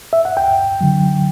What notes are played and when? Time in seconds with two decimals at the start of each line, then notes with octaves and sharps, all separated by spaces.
0.13 E5
0.25 F#5
0.37 D2 G5
0.81 D3 F#3